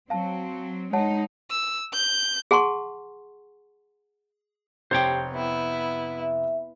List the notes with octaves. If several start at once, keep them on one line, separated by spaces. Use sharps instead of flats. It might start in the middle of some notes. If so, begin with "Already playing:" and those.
F#3 C4 F5 A5
G#3 D#4 C#5 F#5 A5
E6
G6
G#4 F#5 A5 C6 C#6
F1 G4 C5 C#5 G5
B3 E4
E5